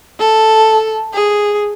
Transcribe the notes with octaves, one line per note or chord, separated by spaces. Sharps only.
A4
G#4